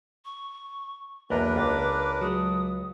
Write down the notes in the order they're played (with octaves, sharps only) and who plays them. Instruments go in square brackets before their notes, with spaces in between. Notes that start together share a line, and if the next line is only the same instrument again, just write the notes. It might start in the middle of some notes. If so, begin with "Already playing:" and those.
[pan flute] C#6
[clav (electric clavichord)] B1 E2 [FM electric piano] A#3 [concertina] D4 A#4 B4 [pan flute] D#5
[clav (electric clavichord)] C#2 [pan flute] D6
[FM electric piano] F#3 G#3 [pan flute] D#6